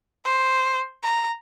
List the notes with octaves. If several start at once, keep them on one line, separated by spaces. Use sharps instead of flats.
C5
A#5